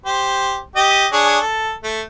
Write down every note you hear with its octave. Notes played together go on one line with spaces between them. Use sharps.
G4 C5
G4 D#5
D4 G#4 C#5
A4
A3